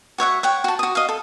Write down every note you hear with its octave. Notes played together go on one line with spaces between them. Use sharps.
F#4 C#5 E5 F#5
C#5 F#5 G5
F#4 A5
F#4 D#6
D#5 F5
A4